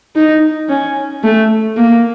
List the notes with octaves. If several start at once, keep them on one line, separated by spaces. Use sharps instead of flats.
D#4
C#4
A3
A#3